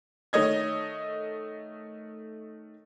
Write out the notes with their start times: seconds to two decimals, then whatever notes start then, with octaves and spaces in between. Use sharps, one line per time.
0.33 D#3 A3 C#5 D#5 G#6